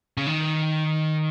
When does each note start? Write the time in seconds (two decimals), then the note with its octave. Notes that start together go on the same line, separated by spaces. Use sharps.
0.17 C#3
0.27 D#3